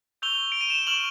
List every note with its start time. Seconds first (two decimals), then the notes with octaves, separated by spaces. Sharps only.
0.22 C#6 E6 G6 F7 G7
0.52 D7
0.61 D#7
0.70 E7
0.79 F7
0.87 C#6 F6 E7 F#7